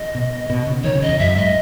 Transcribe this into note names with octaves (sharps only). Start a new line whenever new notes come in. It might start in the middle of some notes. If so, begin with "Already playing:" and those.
Already playing: D#5
B2
B2
C#3
D#3 C#5
C#3
D#5
E2
F#2 E5
G#2 D#5